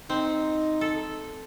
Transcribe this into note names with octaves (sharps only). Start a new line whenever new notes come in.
C4 D#4
A4